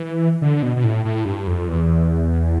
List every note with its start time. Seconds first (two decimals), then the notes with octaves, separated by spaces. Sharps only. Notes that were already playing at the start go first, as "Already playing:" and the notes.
Already playing: E3
0.42 D3
0.62 B2
0.76 B2
0.84 A2
1.05 A2
1.25 G2
1.47 F2
1.68 E2